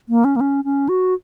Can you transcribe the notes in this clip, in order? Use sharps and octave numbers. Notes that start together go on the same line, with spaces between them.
A#3
C#4
A#3
C#4
C#4
F#4